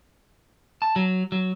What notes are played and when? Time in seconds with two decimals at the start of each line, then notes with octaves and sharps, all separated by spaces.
0.82 A5
0.96 F#3
1.32 F#3